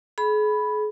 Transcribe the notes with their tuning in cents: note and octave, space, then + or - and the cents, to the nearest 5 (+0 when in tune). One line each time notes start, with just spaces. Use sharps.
G#4 +40 B5 +0